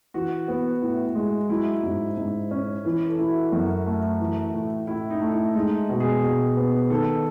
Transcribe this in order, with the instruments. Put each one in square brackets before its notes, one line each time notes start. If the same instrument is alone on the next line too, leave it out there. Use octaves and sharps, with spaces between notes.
[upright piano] E3 [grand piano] F#4
[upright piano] B3
A2
G#3
[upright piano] F#3 [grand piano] E4
[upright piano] G#2
G#2
C#4
[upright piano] E3 [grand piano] B4
[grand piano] A4
[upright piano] E4
[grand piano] F#4
[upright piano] F#2 [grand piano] F#4
[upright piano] A3
E3
A2
[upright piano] A2 [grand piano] E4
[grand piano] D#4
[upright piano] A3
[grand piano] E4
[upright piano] G#3 [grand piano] D#4
[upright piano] B2
[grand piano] G#4
[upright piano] B2
B3
[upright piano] D#3 [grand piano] A4